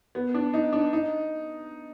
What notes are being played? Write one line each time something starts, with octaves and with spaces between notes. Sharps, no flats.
B3
D4
D#4
D4
D#4